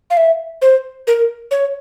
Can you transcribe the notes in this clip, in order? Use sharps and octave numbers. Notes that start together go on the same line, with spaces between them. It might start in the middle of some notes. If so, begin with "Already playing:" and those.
F5
E5
C5
A#4
C#5